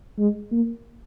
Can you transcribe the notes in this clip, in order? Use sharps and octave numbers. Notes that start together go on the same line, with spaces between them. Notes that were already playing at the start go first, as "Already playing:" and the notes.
G#3
A#3